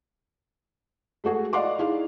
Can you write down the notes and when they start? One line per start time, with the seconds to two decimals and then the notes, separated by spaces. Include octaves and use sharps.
1.24 G#3 A3 F#4 G#4
1.53 D5 D#5 F5 F#5 C6 D6
1.78 D#4 E4 G#4 F5